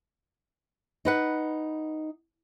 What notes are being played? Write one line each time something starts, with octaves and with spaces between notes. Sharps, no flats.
D#4 B4 F#5